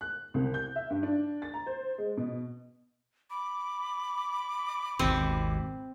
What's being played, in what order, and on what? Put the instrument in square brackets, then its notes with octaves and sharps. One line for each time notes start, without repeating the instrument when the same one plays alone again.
[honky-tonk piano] F#6
C2
G6
E5
G2
D4
A6
A#5
C5
G#3
B2
[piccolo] B5 [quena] D6
[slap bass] G#1 D#2 B2 [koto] C4